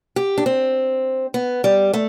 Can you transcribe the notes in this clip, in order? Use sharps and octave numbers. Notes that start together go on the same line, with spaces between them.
G4
D4
C4
B3
G3
A3